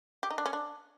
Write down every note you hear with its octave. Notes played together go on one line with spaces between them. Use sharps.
G4
D#4
D4
C#4
D4